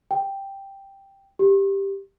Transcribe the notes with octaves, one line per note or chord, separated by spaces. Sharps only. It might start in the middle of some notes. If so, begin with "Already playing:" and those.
G5
G4